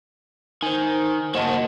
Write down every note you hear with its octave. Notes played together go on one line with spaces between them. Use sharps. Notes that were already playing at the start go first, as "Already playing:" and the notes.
D#3 C5 G#5
A#3 F#4 C5 D#5 A5